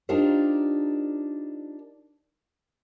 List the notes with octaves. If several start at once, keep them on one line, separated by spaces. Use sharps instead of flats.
D4 D#4 F4 G4 A#4 C5